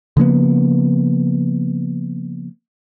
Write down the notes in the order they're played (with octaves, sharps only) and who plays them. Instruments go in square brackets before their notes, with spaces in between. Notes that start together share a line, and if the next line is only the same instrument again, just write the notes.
[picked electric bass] C#3 F3 A#3 B3